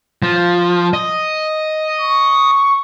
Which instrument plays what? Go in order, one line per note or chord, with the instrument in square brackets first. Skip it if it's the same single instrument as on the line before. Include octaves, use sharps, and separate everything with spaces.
[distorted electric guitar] F3
D#5
[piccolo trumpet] C#6